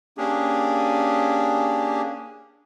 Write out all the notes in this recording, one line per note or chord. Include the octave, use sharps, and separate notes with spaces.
A#3 C#4 D4 G4 G#4